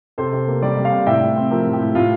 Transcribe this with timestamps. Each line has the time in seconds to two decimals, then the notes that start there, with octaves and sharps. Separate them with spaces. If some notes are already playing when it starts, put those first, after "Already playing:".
0.18 C3 A4 C5
0.33 C3
0.48 A#3
0.62 G3 A#4 D5
0.77 C3
0.85 D5 F5
0.91 C3
1.06 A2 E5 G5
1.21 A2
1.36 C4
1.51 F3 G4 A#4
1.65 A2
1.73 G4
1.80 A2
1.95 A2 F4